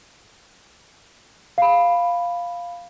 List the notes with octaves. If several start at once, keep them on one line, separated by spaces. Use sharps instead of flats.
F5 B5